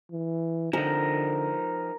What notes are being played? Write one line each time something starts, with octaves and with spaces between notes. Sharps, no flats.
E3
D3 F3 D#4 A#4